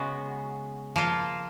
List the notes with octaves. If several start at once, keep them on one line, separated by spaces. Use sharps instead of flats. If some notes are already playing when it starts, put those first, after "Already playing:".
Already playing: C#3 G#3 B3 F#4
F3 A#3 F4